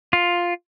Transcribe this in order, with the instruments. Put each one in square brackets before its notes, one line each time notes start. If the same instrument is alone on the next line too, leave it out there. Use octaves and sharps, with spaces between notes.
[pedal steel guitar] F4